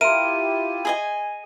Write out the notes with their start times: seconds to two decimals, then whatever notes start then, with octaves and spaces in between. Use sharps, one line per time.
0.01 E4 F4 G4 A#4 E5 C6 D#7
0.85 G#4 D#5 G#5